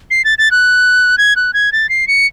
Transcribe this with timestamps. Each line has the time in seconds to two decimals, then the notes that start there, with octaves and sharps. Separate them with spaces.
0.11 C7
0.25 A6
0.38 A6
0.51 F#6
1.18 G#6
1.36 F#6
1.54 G#6
1.72 A6
1.89 C7
2.08 C#7